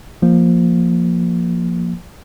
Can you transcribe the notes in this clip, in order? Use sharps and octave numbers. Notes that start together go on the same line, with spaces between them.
F3 A#3